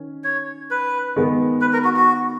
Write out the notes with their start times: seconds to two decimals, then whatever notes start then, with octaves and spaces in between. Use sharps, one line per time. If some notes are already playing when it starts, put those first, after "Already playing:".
Already playing: D#3 C#4
0.24 C#5
0.71 B4
1.16 D#3 G#3 B3
1.61 B4
1.73 A#4
1.84 F#4
1.96 F#4